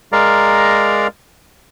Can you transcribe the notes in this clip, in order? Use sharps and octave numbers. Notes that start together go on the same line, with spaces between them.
G#3 A#4 D5 F5 A#5